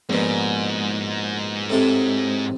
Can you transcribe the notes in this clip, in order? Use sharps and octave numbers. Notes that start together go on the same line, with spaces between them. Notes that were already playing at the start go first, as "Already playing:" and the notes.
A#1 G#2 B2
A2 C3 A4